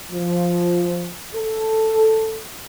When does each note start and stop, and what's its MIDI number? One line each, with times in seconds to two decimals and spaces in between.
0.11 1.10 53
1.35 2.37 69